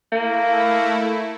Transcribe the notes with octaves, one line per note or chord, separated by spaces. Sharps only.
A3 A#3 E4